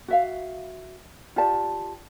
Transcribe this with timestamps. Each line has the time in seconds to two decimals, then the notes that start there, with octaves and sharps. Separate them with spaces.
0.08 F#4 E5 F5
1.36 F4 G4 D5 A5